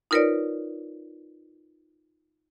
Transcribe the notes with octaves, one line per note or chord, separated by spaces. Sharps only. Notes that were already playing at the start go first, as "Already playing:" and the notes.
D#4 F4 A#4 B4 C#5 D5